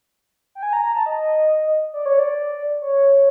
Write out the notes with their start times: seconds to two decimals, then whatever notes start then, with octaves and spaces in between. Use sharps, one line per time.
0.55 G5
0.63 G#5
0.73 A#5
0.84 A#5
0.95 A5
1.06 D#5
1.93 D5
2.06 C#5
2.19 D5
2.81 C#5